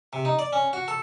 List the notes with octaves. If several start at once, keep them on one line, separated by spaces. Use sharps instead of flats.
C3
D#4
D5
C#4
F#4
A4